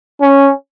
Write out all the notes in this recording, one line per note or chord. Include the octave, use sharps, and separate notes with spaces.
C#4